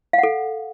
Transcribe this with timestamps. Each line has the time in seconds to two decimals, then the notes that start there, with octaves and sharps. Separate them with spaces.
0.13 F5
0.18 F#5
0.23 A4